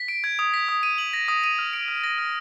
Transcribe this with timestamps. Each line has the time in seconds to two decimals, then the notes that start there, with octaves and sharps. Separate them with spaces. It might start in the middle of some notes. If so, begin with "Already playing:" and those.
Already playing: B6
0.08 D7
0.24 G#6
0.39 D#6
0.54 B6
0.69 D#6
0.83 D#7
0.98 F#7
1.13 A#6
1.28 D#6
1.44 D#7
1.59 F6
1.73 D7
1.88 F6
2.04 A#6
2.18 F6